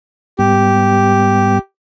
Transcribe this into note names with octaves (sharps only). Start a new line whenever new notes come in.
G#2 G3 B3 G4